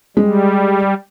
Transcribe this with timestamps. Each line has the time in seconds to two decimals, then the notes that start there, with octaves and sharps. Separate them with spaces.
0.17 G3 G#3